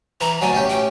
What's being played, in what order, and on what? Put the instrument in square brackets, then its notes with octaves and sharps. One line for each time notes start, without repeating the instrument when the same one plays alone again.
[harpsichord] E3 [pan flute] A#5
[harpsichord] D2 F#3 [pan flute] G#5
[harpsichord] A2 C#4 G4
[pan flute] G5